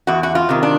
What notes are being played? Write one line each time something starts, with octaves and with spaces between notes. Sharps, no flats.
E2 F#4
F#4
F4
C3 D#3
D4